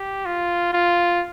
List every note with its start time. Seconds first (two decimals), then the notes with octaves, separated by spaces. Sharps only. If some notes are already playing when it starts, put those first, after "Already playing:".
Already playing: G4
0.25 F4
0.73 F4